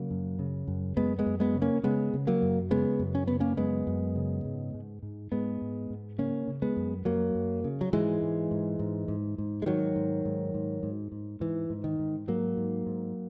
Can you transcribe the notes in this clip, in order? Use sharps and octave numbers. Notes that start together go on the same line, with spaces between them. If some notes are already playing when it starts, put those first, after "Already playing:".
Already playing: C#3 F#3 A#3
F#2
C#3
F#2
F#2 G#3 B3
G#3 B3
F#2
G#3 B3
C#3
A#3 C#4
C#3 G#3 B3
C#3
F#3 A#3
F#2
C#3 G#3 B3
F#2
C#4
C#3 B3
A#3 C#4
F#2 G#3 B3
F#2
C#3
G#2
G#2
G#2
G#2 G#3 B3
G#2
G#2
C#3 A#3 C#4
C#3
G#3 B3
F#2
F#2 F#3 A#3
F#2
C#3
F#3
G#2 E3 G#3
G#2
G#2
G#2
G#2
G#2
G#3
G#2 D#3 F#3
G#2
G#2
G#2
G#2
G#2
G#2 E3
G#2
D#3
G#2
G#2 F#3 A#3
G#2
G#2